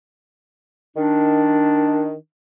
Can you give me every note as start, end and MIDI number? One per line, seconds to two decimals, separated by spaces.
0.97 2.14 51
0.97 2.14 62